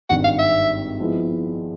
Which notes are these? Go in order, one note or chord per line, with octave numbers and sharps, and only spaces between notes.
G#1 G2 D#3 F#5
F5
E5
F3 G#3 B3 E4